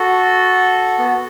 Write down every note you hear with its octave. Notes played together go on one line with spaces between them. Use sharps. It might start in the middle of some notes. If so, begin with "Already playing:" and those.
Already playing: F#4 A4
B3